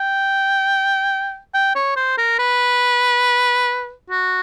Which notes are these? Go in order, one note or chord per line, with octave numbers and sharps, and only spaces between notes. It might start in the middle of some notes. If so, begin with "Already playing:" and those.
Already playing: G5
G5
C#5
C5
A#4
B4
F#4